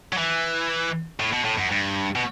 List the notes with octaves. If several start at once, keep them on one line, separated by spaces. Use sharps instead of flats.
F#3
E3
A2
B2
A2
F#2
G2
B2